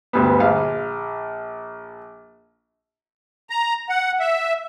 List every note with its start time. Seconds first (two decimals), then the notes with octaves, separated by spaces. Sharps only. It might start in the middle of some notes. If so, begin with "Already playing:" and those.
0.13 D2 G2 B3
0.40 A#1 F5
3.50 A#5
3.89 F#5
4.20 E5